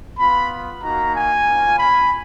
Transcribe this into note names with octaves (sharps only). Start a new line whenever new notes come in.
B3 F4 B5
A#3 D#4 F#4 A#5
G#5
A#3 C#4 F4
B5